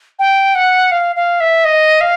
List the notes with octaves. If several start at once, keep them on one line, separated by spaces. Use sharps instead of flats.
G5
F#5
F5
F5
E5
D#5
F5